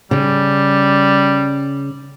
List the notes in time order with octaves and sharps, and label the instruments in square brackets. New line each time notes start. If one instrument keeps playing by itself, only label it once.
[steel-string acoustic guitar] C#3 [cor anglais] G3